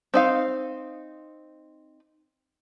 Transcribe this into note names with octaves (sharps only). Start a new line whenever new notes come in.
C4 D#4 F5